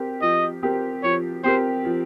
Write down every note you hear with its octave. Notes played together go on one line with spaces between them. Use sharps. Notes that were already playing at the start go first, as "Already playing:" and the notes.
Already playing: C4 G4 A#4
F3 D#5
C4 G4 A#4
F3 C#5
C4 G4 A#4 C5
F3